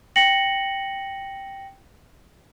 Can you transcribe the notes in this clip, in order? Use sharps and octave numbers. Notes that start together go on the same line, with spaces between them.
G5 A#6 C#7 F#7